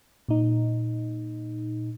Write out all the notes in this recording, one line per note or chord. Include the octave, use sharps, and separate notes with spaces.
A#2 D#4